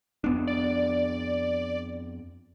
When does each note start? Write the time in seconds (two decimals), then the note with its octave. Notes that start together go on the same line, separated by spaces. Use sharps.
0.24 F2 B3 D4
0.47 D5